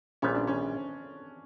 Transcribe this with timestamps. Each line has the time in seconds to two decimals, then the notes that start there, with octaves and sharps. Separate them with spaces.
0.22 A#1 A#2 G3 B3 C#4
0.35 D4
0.47 C#4